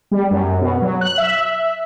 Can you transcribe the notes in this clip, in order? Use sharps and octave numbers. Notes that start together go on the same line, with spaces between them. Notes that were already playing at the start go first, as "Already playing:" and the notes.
G3
F#2
B2
F#3
F#6
E5